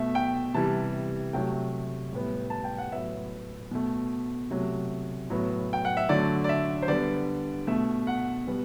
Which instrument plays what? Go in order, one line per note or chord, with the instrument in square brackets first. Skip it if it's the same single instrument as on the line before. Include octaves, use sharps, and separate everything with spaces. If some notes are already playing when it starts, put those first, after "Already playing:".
Already playing: [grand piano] B2 A3 E5
G5
C3 E3 G3 A5
C3 F#3 A3 G5
A2 G3 B3
A5
G5
F#5
A2 F#3 B3 E5
B2 A3
C3 F#3 A3
A2 F#3 B3
G5
F#5
E5
D3 F#3 A3 D5
D5
E5
C5
D3 G3 B3 D5
B2 A3 E5
F#5
B2 G3 B3